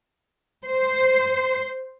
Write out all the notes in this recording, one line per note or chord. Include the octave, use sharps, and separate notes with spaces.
C5